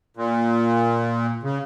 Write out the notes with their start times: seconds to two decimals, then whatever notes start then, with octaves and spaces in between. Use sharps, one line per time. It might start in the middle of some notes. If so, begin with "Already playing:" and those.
0.17 A#2
1.43 C#3